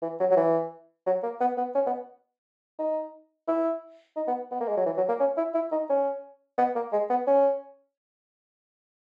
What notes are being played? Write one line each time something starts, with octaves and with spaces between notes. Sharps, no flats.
E3
F#3
F#3
E3
F#3
A#3
B3
B3
C#4
B3
D#4
E4
D#4
B3
B3
A#3
G#3
F#3
E3
F#3
A#3
C#4
E4
E4
D#4
C#4
B3
A#3
G#3
B3
C#4